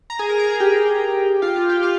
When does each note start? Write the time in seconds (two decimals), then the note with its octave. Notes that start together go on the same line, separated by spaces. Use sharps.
0.10 A#5
0.19 G#4 G#5
0.29 A#4 A#5
0.39 A#4 A#5
0.49 G#4 G#5
0.60 G4 G5
1.42 F4 F5
1.56 F4 F5
1.69 G4 G5
1.83 F4 F5